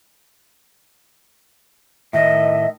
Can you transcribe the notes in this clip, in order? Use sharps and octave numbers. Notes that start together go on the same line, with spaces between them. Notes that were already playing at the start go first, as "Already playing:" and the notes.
A2 D#3 D#5 E5